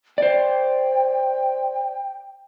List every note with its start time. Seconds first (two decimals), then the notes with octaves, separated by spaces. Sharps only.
0.18 C5 D5 G5